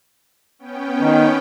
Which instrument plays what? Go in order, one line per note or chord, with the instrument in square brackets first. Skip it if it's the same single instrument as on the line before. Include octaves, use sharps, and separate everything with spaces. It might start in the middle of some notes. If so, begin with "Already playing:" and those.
[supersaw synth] B3 C#4 G5
[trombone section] D#3